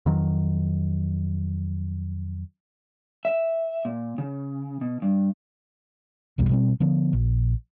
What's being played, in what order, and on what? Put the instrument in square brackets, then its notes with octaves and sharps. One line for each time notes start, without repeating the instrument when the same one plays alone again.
[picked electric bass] F2 D#3 F#3
[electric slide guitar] E5
A#2
C#3
B2
G2
[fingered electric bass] B1 E2 B2 G3
B2 G3 C4
D3 F3 B3
A#1